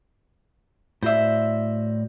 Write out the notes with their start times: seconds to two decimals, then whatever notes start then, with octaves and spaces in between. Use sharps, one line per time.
1.03 A2 F#4 C5 D5 E5